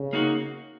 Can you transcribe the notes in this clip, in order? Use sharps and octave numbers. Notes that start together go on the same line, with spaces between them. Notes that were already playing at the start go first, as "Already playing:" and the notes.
Already playing: C#3
A#3 D#4 F#4